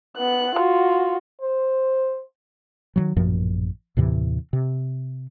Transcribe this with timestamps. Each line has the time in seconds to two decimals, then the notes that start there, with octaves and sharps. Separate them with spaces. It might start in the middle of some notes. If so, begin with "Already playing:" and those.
0.17 B3 F#6
0.55 F4 F#4
1.41 C5
2.96 D#3 E3 F#3
3.16 A1 F#2 A#2 F3
3.97 D#2 A2 C3 E3
4.53 C3